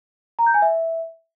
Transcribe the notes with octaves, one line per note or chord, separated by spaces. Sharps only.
A#5
G6
G#5
E5